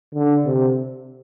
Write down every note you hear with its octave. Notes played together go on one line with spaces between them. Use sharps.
D3
C3